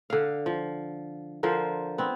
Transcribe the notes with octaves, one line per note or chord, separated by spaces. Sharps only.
D3 F5
F3
D3 F3 A#4 C5
B3 C4